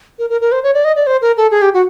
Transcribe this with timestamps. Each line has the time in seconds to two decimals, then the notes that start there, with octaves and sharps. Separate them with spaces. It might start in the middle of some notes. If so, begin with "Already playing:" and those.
0.19 A#4
0.30 A#4
0.41 A#4
0.52 C5
0.63 C#5
0.74 D5
0.85 D#5
0.96 D5
1.07 C5
1.22 A#4
1.37 A4
1.51 G#4
1.62 G4
1.74 F#4